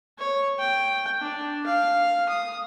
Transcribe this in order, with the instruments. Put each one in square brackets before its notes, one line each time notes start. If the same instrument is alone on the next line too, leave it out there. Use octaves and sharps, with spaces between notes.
[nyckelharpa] C#5
G5
D4
F5
D#6